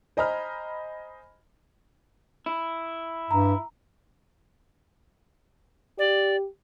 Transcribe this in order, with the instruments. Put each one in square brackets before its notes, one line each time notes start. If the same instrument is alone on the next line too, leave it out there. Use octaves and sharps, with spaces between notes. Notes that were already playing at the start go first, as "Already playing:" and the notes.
[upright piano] C5 D#5 G#5 A#5 B5 F6
[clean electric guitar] E4
[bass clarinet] G2 [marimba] A#5
[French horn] G4 [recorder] D5